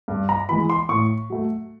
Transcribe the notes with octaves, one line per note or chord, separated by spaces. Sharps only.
G2
A#5
E3 G#3 B5
C6
A2 C#6
F#3 A3